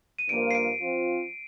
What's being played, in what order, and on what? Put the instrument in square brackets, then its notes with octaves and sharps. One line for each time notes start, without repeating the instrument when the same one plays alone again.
[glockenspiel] D#7
[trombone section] G2 F3 A#3 F4 [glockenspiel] D7
[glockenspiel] C7
D7
[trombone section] F3 C4 F4